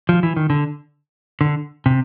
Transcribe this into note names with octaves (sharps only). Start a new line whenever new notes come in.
F3
E3
D#3
D3
D3
C3